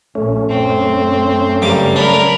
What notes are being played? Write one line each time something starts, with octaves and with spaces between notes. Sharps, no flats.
A#1 A#2 A3 C#4
F#2 C4
G2 C#3 F#3 A#3 D6
D4 A#4 B5